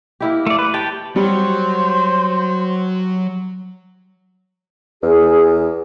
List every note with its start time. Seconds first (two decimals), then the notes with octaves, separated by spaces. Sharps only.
0.21 A#3 E4 G4
0.47 A3 D5
0.59 B4
0.74 G4 G5 A5
1.16 F#3 G3 C5
5.03 E2 G#4